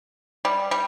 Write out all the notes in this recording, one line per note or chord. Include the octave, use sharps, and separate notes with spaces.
G3
G3